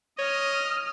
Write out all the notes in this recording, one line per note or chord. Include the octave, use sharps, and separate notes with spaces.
C#5 D#5 D#6 F6